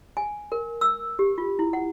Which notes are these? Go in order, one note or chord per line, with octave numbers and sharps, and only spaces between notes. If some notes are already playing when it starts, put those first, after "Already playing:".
G#5
A#4
E6
G4
F4
E4
F#5